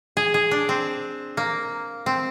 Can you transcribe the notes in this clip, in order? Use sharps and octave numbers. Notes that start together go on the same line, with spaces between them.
G#4
G#4
D4
C4
A#3
C4